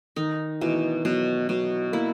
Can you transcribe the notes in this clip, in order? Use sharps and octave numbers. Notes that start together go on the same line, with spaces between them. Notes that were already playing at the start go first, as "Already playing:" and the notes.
D#3 D#4
B2 E3
B2 F#3
B2 F#3
A#3 E4